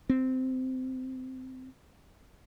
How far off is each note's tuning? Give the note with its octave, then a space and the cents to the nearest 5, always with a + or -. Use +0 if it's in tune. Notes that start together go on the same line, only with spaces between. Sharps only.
C4 -15